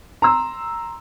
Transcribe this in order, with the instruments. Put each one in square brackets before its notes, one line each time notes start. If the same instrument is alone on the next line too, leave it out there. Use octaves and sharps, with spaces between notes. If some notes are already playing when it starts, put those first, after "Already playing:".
[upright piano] A#5 C6 E6